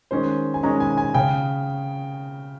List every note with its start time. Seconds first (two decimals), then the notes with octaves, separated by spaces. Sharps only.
0.11 D#3 G#3 C#4 C5
0.54 G#5
0.63 D#3 G#3 C#4 A#5
0.80 G#5
0.98 G#5
1.14 C#3 G5